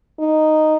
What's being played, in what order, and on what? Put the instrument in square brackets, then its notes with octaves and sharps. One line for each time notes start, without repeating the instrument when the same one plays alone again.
[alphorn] D#4